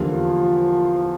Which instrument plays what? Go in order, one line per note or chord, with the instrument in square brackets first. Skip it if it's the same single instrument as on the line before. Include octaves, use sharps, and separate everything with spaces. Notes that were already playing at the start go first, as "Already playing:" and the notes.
Already playing: [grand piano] E2 D3 G3 A#3 F4 [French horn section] F3